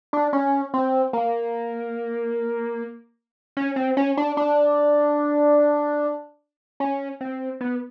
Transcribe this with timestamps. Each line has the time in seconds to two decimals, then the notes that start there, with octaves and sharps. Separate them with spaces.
0.13 D4
0.33 C#4
0.74 C4
1.13 A#3
3.57 C#4
3.76 C4
3.97 C#4
4.17 D4
4.37 D4
6.80 C#4
7.21 C4
7.61 B3